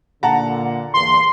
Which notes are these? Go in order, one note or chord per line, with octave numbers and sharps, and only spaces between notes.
A#2 D3 F#5 A5 A#5
E2 G2 A#2 C6